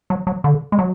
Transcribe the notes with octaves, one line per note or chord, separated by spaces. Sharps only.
F#3
F#3
D3
G#3
F#3